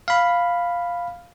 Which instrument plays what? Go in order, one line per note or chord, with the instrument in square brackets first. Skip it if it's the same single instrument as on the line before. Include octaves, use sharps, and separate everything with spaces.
[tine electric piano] F5 B5